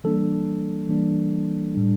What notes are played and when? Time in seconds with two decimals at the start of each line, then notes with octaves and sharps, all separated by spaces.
0.04 E3 G3 A#3 D4 A4
0.89 E3 G3 A#3 D4
1.75 A2 G3 D4